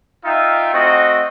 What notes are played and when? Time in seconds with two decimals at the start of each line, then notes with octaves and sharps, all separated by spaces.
0.25 D#4 F4 E5 G5
0.72 A3 C4 F#4 D#5